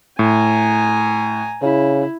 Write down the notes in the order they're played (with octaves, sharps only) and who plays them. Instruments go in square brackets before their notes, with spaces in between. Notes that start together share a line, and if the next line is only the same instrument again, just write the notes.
[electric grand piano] A2 [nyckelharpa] G#5 A#5
[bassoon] C#3 [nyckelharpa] E4